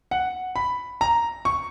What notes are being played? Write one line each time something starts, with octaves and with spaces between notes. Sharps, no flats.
F#5
B5
A#5
C#6